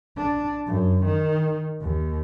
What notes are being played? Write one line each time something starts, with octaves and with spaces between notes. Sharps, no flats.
D4
F#2
D#3
D#2